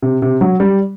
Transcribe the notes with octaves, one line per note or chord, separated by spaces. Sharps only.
C3
C3
F#3
G3